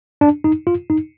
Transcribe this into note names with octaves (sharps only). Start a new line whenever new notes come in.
D4
D#4
F4
D#4